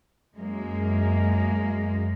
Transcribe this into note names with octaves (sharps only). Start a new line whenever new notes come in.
F#2 G#3 A#3